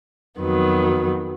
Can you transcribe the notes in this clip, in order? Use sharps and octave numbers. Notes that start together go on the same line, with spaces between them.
F2 D#3 F#3 B3